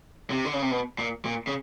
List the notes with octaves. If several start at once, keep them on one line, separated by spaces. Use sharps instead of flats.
C3
D3
C#3
C3
B2
A#2
A#2
C#3